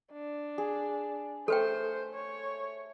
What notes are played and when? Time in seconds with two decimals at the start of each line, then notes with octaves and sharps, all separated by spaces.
0.12 D4
0.58 G#4
1.48 A3 A4 B4 C5 G5
2.14 C#5